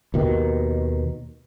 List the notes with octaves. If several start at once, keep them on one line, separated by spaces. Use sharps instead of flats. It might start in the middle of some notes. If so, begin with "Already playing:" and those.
D#2 B2 D#3